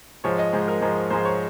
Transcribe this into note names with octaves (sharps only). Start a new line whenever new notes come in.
G#2 F3 G#3 C#5
D#5
G#2 F3 G#3
A#4
G#2 F3 G#3
G#2 F3 G#3 C5
C#5